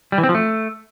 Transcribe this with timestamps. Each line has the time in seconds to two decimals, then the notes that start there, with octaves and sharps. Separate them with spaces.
0.12 G3
0.18 E3
0.23 C4
0.29 F3
0.35 A3